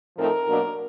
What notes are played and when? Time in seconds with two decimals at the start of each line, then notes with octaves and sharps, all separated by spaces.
0.17 A2 F3 A3 C4 D#4 A#4
0.48 B2 F#3 A#3 D4